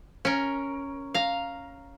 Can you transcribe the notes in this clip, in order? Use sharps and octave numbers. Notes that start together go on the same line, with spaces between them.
C#4 A#4
F5 A#5